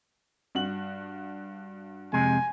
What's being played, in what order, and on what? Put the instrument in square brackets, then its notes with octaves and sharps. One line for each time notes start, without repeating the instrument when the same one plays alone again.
[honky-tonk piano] G2 F#4 F#7
[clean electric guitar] F2 C3 G#3 [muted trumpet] G#5